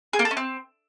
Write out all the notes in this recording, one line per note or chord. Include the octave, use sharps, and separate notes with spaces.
G#4
A#3
A4
C#4
C4